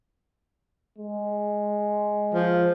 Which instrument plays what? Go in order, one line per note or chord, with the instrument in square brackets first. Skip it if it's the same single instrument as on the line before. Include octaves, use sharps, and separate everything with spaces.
[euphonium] G#3
[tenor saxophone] F3